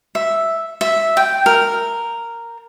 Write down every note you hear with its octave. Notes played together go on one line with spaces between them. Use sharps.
E5
E5
G5
A#4